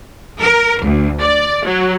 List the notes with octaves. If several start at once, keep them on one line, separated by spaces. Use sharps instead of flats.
A#4
D2
D5
F#3